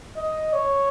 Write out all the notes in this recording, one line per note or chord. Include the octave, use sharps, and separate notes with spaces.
D#5
C#5